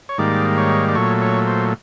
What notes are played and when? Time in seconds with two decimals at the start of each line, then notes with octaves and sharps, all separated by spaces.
0.09 C#5
0.18 G#2 D#3 G3 A#3 D5
0.58 C#5
0.89 D5
0.95 A#2 F#3 A3 C#5
1.22 C#5
1.47 C5